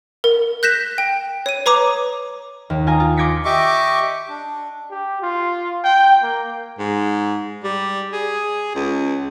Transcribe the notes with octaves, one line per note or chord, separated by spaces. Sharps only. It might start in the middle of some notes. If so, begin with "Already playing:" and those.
A#4
F#6 G6 A#6 B6 E7
G5
C#5 D#7
B4 C#5 A#5 D6 D#6
D#2
F4 G#5 A#5 D#6
F4
C6 D6 G#6 A#6 B6 C#7
G4 D#5 E5 C#6 D6
D4
G4
F4
G5
A#3
G#2
G3
G#4
C#2